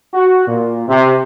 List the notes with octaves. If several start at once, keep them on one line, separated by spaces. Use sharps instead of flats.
F#4
A#2
C3